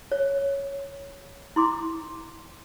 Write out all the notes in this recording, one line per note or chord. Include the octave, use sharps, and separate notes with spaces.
C#5
E4 C6 D6